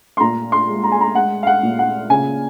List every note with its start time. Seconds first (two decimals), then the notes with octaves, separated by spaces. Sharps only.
0.17 C6
0.20 A#2 A#5
0.52 C6
0.68 G#3
0.83 A#5
0.92 G#5
1.01 A#5
1.15 G#3 F#5
1.43 F5
1.47 F#5
1.63 A#2
1.79 F#5
2.10 C#3 G#5